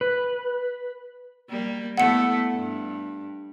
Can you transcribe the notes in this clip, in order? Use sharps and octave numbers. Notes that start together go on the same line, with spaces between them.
B4
G3 A#3
A3 B3 E4 F#5 C#7
G2